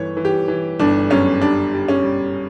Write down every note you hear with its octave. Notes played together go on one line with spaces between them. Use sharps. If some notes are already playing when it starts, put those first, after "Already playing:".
Already playing: G1 E3 C#5
E3
G4
E3
G1 D4
F#2 C#4
G3 D4
G3
C#4
G3